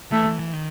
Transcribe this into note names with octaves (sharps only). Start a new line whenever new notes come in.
E3 A3
E3
E3
D#3